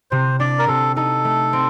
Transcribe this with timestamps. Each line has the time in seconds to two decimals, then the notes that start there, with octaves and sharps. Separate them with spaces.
0.11 C3 C5
0.40 D4 D5
0.59 A#4
0.68 C3 A4
0.96 D#4 A4
1.25 A3
1.53 C4